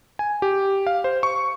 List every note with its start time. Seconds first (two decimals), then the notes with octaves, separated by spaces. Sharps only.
0.19 G#5
0.42 G4
0.87 F5
1.04 C5
1.23 C#6